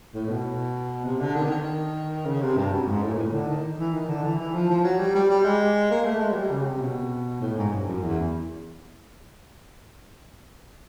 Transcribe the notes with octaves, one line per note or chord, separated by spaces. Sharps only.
A2
B2
C3
D3
D#3
D3
D#3
C#3
C3
G2
F#2
G#2
A2
A#2
A2
D3
D#3
E3
D#3
D3
E3
E3
F3
F3
F#3
G3
G3
G3
G#3
A#3
A3
G#3
F#3
G3
C#3
C3
B2
A2
G#2
G2
F#2
E2